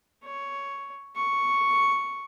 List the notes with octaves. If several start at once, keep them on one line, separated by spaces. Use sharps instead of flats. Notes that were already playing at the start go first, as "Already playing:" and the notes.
C#5
C#6